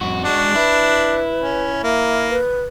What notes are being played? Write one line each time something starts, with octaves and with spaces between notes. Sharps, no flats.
F2 F#4
G#3 D4 F#4
E4 B4
C#4
A#3 E5
B4